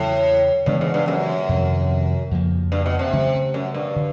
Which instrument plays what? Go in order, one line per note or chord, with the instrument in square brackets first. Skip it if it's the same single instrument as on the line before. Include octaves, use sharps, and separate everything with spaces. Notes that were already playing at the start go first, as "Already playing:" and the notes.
Already playing: [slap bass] E2 C#3 F#3 [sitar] A2
[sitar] G2 [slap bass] C#3 E3 G#3 B3
[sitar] G#2
G2
F#2
[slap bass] F2 C3 D#3
F2 C#3 F3 A#3
[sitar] G2
B2
C3
[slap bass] C#3 F#3 A3 C#4
[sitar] F#2
G2
[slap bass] D3